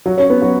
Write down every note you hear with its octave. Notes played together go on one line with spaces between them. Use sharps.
F#3 F#4
C#4 C#5
B3 B4
F#3 F#4